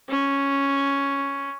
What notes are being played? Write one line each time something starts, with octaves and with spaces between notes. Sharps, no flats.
C#4